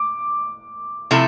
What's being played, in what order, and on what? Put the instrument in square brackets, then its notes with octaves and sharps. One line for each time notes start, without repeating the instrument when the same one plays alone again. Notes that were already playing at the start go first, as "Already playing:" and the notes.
Already playing: [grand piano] D6
[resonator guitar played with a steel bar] C3 F3 A3 E4